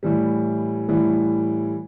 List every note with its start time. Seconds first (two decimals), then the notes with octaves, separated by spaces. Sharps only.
0.03 A2 E3 G3
0.88 A2 E3 G3